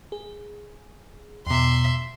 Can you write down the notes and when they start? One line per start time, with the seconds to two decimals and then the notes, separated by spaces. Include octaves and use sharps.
0.12 G#4
1.47 E2 B2 E5 C6